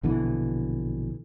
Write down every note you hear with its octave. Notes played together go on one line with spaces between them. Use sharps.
A#1 B2 D3 E3